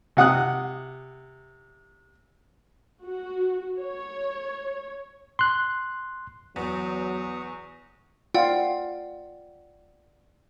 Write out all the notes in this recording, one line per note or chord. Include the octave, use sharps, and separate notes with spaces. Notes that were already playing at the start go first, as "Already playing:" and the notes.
C3 F#5 D#6 F#6
F#4
C#5
C6 F#6
E2 F#3 B3 C#6 D#6
F4 D5 F#5 G5